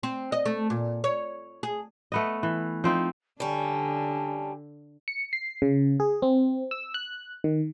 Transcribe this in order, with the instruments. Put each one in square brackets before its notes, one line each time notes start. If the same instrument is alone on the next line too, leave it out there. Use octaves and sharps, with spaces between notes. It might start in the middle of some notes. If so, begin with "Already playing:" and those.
[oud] C4
D#5
A3
A#2
C#5
G#4
[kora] A3 B3 D#5
E3
F3 C4 D#4
[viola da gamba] D3 [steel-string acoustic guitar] G3 C#4 [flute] A5
[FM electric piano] C#7
C7
C#3
G#4
C4
E6
F#6
D#3